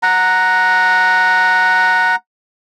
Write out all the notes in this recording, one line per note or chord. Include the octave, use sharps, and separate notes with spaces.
F#5 A#5